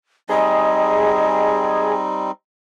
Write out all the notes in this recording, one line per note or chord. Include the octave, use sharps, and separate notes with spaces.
G3 C4 D#4 G#4 D#5